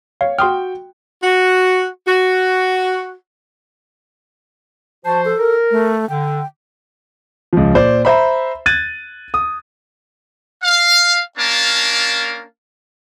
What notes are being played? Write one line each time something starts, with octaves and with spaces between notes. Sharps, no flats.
C#5 F5
F#4 G5 C6 D#6 F6
F#4
F#4
F3 F#4 C5 A5
A4
A#4
A3
D3 G5
C#2 F3
A#2 C5 D5
C5 E5 A#5 B5
F#6 G#6 A6 D#7
D#6
F5
A#3 C#4 D4 A#4 F5 A5